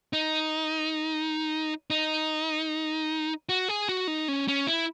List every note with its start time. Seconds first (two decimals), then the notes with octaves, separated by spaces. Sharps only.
0.13 D#4
1.90 D#4
3.49 F#4
3.69 G#4
3.89 F#4
4.08 D#4
4.28 C#4
4.48 C#4
4.67 E4